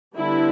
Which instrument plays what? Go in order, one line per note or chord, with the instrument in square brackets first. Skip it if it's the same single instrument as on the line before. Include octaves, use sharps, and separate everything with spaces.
[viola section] D3 G3 B3 D4 E4